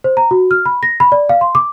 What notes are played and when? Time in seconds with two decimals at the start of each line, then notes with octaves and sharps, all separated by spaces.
0.04 C5
0.17 A#5
0.31 F#4
0.51 F6
0.66 B5
0.83 A#6
1.00 B5
1.12 D5
1.29 F5
1.41 C6
1.55 D6